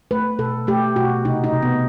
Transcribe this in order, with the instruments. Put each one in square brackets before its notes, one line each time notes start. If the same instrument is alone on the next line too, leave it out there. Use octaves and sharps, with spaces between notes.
[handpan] A3 B4
B2 A4
A3 G4
B2 F#4
C3 D#4
D#4
C3
B3